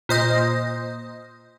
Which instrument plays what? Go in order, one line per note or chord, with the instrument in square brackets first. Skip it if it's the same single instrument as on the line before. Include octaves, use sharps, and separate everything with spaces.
[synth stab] A#2 C5 D#5